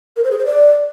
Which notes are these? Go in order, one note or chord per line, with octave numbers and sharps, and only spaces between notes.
A#4
C5
G#4
C5
D5